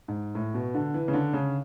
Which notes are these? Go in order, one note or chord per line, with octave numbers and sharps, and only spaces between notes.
G#2
A2
B2
D3
E3
C#3
D3
C#3